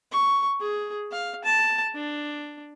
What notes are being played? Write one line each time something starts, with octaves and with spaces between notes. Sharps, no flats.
C#6
G#4
F5
A5
D4